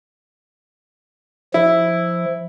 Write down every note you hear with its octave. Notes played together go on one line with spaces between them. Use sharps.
F3 E4